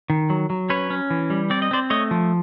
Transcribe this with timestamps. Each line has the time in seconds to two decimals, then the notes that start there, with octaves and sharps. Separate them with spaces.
0.10 D#3
0.30 F#3
0.50 F#3
0.70 C#4 B4 C#5
0.90 C#4
1.10 E3
1.30 G3
1.50 C4 D5
1.62 D#5
1.71 C4 C5 D5
1.90 A3 C#5 D#5
2.11 F3